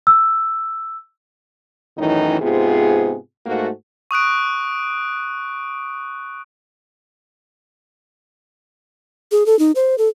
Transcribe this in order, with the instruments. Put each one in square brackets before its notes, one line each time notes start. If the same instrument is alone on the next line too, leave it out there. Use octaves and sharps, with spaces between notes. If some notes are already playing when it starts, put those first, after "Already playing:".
[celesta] E6
[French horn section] F#2 A2 D#3 E3 C#4 D#4
G#2 C3 B3 F4 G#4
G#2 A3 A#3 F#4
[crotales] C#6 D#6 F#6 D7
[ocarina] G#4
A4
D#4
C5
A4